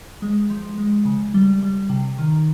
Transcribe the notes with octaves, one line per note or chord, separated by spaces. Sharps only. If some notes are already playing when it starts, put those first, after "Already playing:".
G#3
F3
G#3
C#3
G3
G3
C3
D#3